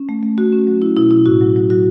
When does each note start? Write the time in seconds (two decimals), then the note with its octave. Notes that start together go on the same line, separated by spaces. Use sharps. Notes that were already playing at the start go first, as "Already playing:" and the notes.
Already playing: C#4
0.09 A3
0.23 A3
0.38 A3 F#4
0.52 C#4
0.67 F#3
0.82 C#4 E4
0.96 B2 E4
1.11 B2 E4
1.26 A2 F#4
1.41 F#3
1.56 F#3
1.70 F#3 F#4